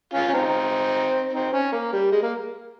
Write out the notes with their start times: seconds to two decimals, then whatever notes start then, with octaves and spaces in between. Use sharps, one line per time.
0.14 C#4 F4
0.28 C#4
0.33 C4 D#4
1.33 C4 D#4
1.53 C#4
1.72 A#3
1.93 G3
2.12 G#3
2.23 A#3